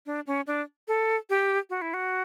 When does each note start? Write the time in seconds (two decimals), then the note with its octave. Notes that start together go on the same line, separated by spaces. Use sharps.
0.06 D4
0.27 C#4
0.47 D4
0.88 A4
1.30 G4
1.70 F#4
1.82 E4
1.94 F#4